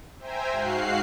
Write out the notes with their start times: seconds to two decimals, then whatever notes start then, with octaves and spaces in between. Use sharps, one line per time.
0.19 C5 E5 G5 G#5 A#5
0.52 G#2 F#4 F5 F#6 C7